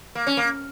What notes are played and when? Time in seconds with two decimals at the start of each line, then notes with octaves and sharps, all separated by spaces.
0.15 A#3
0.27 C#4
0.37 A#3